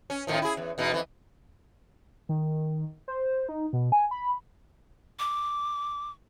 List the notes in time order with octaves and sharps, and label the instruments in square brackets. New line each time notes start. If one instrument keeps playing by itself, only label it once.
[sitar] C#4
A2 D#3 F3
E4 G#4
E2
E2 B2 D#4
F2 E3
[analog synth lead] D#3
C5
D#4
B2
G#5
B5
[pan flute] D6